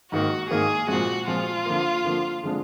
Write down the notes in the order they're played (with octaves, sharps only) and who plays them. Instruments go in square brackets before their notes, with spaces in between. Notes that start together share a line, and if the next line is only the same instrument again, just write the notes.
[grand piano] G#2 D#3 A#3 [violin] F#4
[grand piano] G#2 D#3 A#3 [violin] G#4
[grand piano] A#2 F3 G#3 [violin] F#4
[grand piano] A#2 F3 G#3 [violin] F4
[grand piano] D3 F3 A#3
D3 F3 A#3
D3 F3 G#3 D4